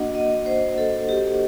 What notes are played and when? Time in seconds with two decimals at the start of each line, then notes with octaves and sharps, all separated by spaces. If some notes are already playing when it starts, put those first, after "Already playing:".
Already playing: A#3 D4 F#4 D#5 F#5
0.15 D#5
0.46 C5
0.78 A4
1.09 G4